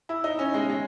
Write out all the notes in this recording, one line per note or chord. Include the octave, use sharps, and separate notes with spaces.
E4
D#4
C#4
G#3
G#3